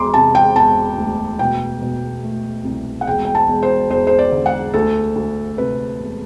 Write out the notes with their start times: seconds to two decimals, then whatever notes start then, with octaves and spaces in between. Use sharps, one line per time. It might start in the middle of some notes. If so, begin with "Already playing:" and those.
Already playing: E1 C6 D6
0.14 C3 A5
0.35 G5
0.56 E1 A5
0.98 D2
1.39 B2 G5
1.82 B2
2.23 A3
2.64 C2
3.01 F#5
3.07 E1 G5
3.25 G5
3.35 A5
3.48 E1
3.63 C5
3.90 E1 C5
4.07 C5
4.19 D5
4.32 D3
4.46 F#5
4.74 D2 A4
5.16 D2
5.58 C3 B4
6.00 E1